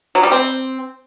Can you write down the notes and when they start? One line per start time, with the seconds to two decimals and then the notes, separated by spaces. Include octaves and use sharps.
0.15 F#3
0.23 G3
0.32 C4